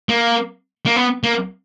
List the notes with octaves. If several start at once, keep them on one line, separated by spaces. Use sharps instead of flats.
A#3
A#3
B3
A#3